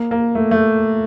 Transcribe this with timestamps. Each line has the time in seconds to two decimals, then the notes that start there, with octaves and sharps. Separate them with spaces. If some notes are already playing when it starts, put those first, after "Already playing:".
Already playing: A#3
0.11 A#3
0.35 A3
0.51 A3